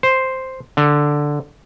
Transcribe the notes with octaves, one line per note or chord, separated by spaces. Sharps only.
C5
D3